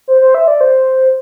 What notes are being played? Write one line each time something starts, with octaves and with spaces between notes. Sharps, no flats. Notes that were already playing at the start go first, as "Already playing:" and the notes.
C5
C5
E5
D5
C5